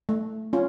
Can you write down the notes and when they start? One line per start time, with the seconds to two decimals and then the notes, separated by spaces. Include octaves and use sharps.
0.09 A3
0.53 C#4 F4